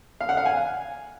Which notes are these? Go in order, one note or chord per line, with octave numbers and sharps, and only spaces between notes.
F5
F#5
F5
G#5